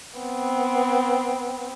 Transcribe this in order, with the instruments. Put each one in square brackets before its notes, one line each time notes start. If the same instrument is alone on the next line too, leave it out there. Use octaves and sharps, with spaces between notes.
[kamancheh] B3 C4